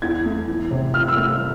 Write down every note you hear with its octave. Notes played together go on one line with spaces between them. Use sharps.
E2 G#6
A3
E3
C3
E3 F6
E6
A3 F6